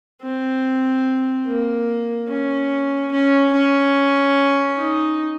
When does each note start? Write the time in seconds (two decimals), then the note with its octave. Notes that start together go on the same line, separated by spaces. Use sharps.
0.22 C4
1.47 A#3
2.28 C#4
3.12 C#4
3.53 C#4
4.77 D#4